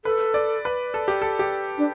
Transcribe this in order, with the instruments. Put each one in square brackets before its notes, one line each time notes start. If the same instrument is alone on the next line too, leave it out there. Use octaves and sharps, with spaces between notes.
[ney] A4 [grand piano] B4
[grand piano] D5
B4
A4
G4
A4
G4
[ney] D4